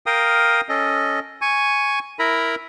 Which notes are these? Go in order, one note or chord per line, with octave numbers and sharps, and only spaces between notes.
A#4 F5 G5 D#6
C#4 A4 D#5
G#5 C#6
E4 A#4 A#5 B5